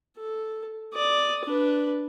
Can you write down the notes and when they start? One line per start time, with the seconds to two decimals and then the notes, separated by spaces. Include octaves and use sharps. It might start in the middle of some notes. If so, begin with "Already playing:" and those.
0.18 A4
0.94 D5 D#6
1.44 D4 B4